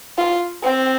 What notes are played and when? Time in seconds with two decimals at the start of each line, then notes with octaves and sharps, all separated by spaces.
0.18 F4
0.63 C4